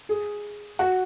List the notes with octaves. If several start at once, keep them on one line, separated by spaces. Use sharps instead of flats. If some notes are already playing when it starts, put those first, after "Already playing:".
G#4
F#4